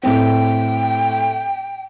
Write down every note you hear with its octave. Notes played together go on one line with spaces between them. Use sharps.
A2 C4 G5